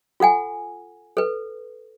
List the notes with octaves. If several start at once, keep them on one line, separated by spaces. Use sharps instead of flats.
F4 A4 F#5 G#5
A4 B4